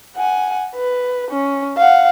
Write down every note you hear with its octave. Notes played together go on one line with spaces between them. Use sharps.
F#5 G#5
B4
C#4
F5 F#5